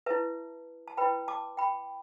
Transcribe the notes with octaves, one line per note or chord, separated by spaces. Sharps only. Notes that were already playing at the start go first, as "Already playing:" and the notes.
E4 B4 E5 A5
A5
E4 B4 G5 B5
A5 D6
G5 B5